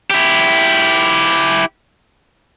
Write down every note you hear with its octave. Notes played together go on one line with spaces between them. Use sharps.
E4 G4